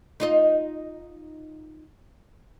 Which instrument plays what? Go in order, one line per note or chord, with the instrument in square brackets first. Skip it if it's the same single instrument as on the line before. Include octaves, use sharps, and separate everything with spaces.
[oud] D#4 F4 D#5